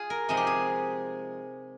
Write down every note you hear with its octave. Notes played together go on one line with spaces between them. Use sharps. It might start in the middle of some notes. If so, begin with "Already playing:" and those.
Already playing: F4 G#4
A#4
C3 F3 G#3 D#4 G#4
G4
G#4